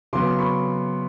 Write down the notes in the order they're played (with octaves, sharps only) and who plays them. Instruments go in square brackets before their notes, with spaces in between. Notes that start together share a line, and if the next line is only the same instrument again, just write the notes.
[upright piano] C#3 F#3 B3 C6 D6
B5 C#6